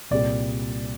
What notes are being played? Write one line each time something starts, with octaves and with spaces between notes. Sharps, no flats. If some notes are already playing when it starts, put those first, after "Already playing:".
C2 A#2 G3 D5